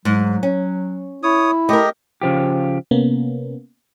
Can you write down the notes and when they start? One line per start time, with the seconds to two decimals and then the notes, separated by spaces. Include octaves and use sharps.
0.05 G#2 F#3
0.43 C#4
1.23 E4 C#5 D#6
1.69 A3 G4 A#4 D#5
2.22 C#3 F3 G4
2.91 C3 A#3 B3 C#4